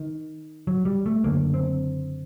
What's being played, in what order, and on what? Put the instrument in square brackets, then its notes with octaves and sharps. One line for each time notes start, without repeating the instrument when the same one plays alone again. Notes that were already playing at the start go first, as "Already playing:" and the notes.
Already playing: [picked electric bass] D#3
F#3
G3
A3
F#1 F#2 D3 A#3
C4